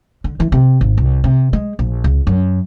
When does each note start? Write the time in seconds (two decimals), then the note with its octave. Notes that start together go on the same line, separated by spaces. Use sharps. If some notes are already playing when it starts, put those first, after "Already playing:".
0.24 D3
0.40 E3
0.52 C3
0.81 G#1
0.97 C2
1.24 C3
1.53 G#3
1.79 A#1
2.04 C#2
2.27 F#2